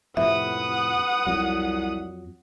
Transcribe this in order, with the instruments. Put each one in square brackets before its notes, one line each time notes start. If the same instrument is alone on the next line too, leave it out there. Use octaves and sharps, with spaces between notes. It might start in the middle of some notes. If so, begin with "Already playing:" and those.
[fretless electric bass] F2 A2 C3 [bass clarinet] B4 [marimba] E5 [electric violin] F#5 D#6
[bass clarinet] C2 [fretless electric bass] F2 F#3